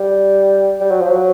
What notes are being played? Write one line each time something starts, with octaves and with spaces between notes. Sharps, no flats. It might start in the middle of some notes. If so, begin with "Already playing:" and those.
Already playing: G3
G3
F#3
F3
F#3